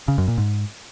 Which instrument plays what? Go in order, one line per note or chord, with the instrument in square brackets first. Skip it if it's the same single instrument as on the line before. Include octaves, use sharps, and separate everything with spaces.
[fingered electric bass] C#3
F#2
A#2
G#2